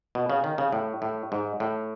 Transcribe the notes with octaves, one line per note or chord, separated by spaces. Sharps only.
B2
C#3
D#3
C#3
A2
A2
G#2
A2